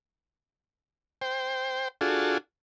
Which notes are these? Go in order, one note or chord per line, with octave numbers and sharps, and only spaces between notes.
C5 G5
D4 F4 F#4 G#4 A4